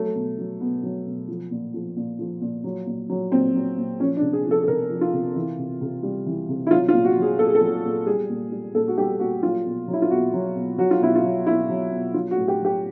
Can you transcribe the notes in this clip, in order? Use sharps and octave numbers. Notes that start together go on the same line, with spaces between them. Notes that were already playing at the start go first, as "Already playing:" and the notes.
Already playing: F#3 A3
B2
F#3
B2 B3
F#3
B2
F3
A#2
F3
A#2
F3
A#2
F#3
A#2
F#3
A#2 C4
F#3
A#2
F3 C#4
D4
C3
G#4
F3
A4
A4
C3 A#4
F3
F4
C3
E3
C3
C3
G3
E3
C3
E4
F#3 F4
F4
A#2
F#4
F#3
G#4
A#2 A4
G#4
A4
F#3
A#2
G3 G#4
A#2
G3
A#2 A4
F#4
G3 G4
A#2 F#4
F#3 F4
B2
F#3
E4
F4
B2 F#4
F#3
B2
F#3 F#4
F4
B2 E4
F4
F#3
B2 E4
F#3
B2
F#3 F4
F#4
A2
G4
F#3
G4